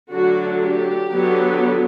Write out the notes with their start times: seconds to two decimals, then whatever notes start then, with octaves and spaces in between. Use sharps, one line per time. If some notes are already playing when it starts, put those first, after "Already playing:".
0.11 D3 F#3 A3 D4 F#4
0.62 G4
1.12 D3 F#3 B3